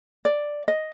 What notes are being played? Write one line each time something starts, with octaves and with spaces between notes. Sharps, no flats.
D5
D#5